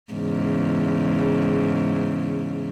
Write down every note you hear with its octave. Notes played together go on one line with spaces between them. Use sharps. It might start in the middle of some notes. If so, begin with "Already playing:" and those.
E2 G#2 C#3